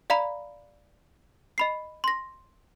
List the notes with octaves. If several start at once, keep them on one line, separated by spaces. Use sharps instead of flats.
D5 F5 A#5 B5 B6
D#5 B5 C7
C6 A#6